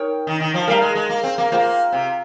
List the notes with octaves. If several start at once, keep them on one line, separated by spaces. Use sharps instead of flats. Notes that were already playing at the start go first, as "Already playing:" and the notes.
Already playing: D#4 A#4 C#5 G5
D#3
D#3
F3
G3 A#4 F5 A#5
G#3
G#3
A#3
C4
A#3
A#3 F4 C5 G5
C3